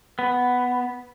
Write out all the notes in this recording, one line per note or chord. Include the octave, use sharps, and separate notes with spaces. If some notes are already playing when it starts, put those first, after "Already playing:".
B3